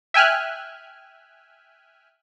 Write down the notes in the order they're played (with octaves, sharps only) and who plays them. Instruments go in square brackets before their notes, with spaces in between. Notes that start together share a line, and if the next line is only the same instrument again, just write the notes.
[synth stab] E5 G5 G#5 F6 F#6